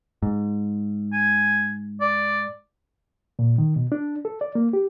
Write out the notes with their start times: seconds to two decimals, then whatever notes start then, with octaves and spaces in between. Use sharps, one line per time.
0.22 G#2
1.13 G#5
2.01 D5
3.39 A#2
3.58 D#3
3.76 B2
3.92 D4
4.25 A4
4.41 D5
4.55 A#3
4.73 G4